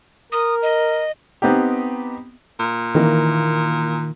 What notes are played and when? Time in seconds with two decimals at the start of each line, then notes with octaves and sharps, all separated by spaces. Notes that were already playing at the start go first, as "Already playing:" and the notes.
0.32 A#4 D#6
0.62 D#5
1.42 B3 C4 D#4 G4
2.60 A#2
2.95 D#3 E3 A#3